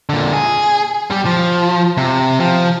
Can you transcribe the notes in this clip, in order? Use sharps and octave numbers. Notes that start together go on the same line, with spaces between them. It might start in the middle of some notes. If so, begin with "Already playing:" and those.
A#2 D3
G#4
G3 G4
F3
C3
F3